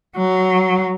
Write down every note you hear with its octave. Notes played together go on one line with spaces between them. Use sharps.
F#3